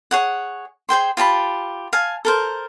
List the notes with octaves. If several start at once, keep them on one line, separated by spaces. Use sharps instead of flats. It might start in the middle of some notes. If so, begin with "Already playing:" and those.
G#4 C#5 F#5
G#4 C5 G5 C6
F4 G4 A5 B5
F5 G#5 A5
A4 A#4 C5